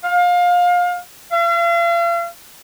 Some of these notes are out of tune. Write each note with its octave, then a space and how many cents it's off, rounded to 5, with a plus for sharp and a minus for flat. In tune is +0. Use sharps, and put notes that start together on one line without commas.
F5 +25
F5 -40